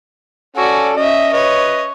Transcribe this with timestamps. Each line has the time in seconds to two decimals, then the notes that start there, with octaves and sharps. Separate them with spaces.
0.56 C#4 F#4 A4 D5
0.96 C#4 D#5 E5
1.33 B4 C#5 D#5